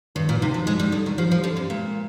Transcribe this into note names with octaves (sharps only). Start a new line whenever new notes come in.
G2 D#3
A#2
C3 D#4
F3
G#3 D#4
G3
D3 G3
D#3
F3 G4
F3
D3 G4
C3
A#2 G#3